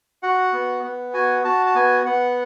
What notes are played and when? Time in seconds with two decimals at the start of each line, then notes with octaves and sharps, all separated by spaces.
0.23 F#4 F#5
0.53 B3
0.84 B3
1.14 F#4 G#5
1.44 F#4 A5
1.66 A5
1.75 B3 G#5
2.06 B3 F#5